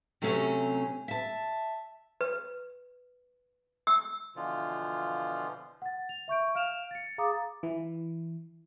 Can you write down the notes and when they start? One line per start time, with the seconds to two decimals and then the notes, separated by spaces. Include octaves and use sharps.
0.22 C3 F#3 A3 C4 C#4
1.08 E5 A5
2.21 B4
3.87 E6
4.36 B2 D3 E3 F3 F4
5.82 F#5 A6
6.09 F7
6.28 E5 C#6 G6 D7
6.55 F5 F6 D7 E7 F7
6.91 A6 C#7
7.18 G#4 F5 A#5 D6 D#6 A6
7.63 E3